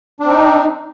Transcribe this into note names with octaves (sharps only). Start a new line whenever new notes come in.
C4 D4 D#4